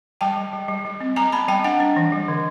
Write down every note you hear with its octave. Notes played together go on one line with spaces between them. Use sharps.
G3 G5 A5
G3
G3
G3
G3
C4
G3 G#5 A#5
B3 A5 B5
G3 G5 A5
D4 F#5 G#5
D4
E3
G3
D3